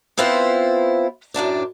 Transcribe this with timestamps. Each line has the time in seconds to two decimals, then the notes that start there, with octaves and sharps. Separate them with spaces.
0.17 B3 C4 E4 F4 B4 C5
1.34 F#2 A2 D4 D5